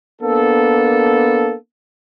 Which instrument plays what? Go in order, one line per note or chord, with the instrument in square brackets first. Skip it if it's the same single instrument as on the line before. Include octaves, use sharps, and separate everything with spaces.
[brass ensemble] A#3 B3 D4 A4